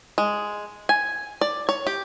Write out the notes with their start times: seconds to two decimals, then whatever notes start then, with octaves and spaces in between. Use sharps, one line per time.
0.18 G#3
0.89 G#5
1.41 D5
1.69 C#5
1.87 G4